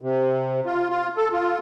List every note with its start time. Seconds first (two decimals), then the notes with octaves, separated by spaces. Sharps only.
0.01 C3
0.66 F4
0.89 F4
1.17 A4
1.33 F4